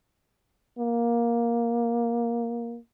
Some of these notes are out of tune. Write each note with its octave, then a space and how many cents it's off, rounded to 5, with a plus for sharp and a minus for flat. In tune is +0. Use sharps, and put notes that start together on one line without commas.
A#3 +10